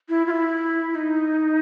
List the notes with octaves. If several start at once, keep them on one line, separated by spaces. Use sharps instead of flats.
E4
F4
E4
D#4